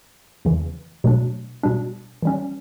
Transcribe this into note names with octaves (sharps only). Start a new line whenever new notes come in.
E2 C#3 E3
B2 F#3 A3 D4
B2 G3 D4
E3 G3 C#4